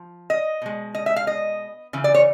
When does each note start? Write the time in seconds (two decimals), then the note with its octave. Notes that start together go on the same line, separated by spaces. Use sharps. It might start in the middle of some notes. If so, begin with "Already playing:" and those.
Already playing: F3
0.30 D#5
0.62 B2 G#3
0.95 D#5
1.06 E5
1.16 F5
1.27 D#5
1.93 C#3 E3
2.04 D5
2.14 C#5